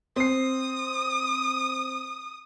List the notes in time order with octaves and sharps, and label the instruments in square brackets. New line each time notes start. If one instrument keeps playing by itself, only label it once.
[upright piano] C4 C7 [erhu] D#6